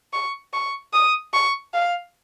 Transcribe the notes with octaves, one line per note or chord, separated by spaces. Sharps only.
C#6
C#6
D#6
C#6
F5